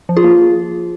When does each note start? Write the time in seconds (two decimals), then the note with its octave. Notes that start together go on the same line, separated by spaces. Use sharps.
0.09 F3
0.17 F4 G#4
0.24 A#3